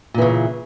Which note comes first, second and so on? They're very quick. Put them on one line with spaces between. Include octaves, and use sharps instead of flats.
A#2 E3 C#3